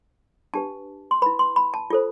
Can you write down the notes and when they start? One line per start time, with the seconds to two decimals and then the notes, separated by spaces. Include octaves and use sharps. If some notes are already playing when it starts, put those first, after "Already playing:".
0.54 D4 G4 B4 A5
1.11 C6
1.22 E4 B4 B5
1.39 C6
1.56 B5
1.74 A5
1.90 F4 A4 C5